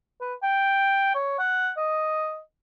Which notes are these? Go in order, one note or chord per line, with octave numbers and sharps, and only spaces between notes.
B4
G5
C#5
F#5
D#5